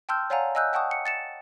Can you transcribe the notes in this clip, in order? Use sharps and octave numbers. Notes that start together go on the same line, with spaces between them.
G5 A5 C6 E6 F6 G6
C#5 D5 F5 F#5 G#5 A#5
D#5 G#5 E6 F#6 G6
F#5 G5 A5 C#6 D#6
C#7
A6 C#7 E7